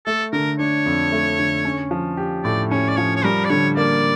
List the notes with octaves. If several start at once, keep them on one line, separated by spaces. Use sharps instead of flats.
A3 A4
D3 A#4
D4 C#5
F2
A3
D3
C#4
F3
G4
A2 D5
C#4 C#5
D5
F3 C#5
C#5
G3 A#4
D5
D3 C#5
A#3 D5